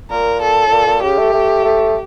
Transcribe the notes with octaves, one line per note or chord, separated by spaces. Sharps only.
A#2 A#4
A4
A2
A#2
A#2
C#3 G4
A3
A3
A3